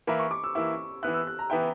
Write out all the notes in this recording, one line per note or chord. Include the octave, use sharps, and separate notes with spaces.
E3 A#3 E4 B5
C#6
D6
E6
E3 A#3 E4 E6
E3 B3 E4 F#6
E6
F#6
A#5
E3 B3 E4 G5